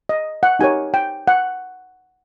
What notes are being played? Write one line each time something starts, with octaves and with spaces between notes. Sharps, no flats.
D#5
F#5
D#4 G4 A#4 C#5 G#5
G5
F#5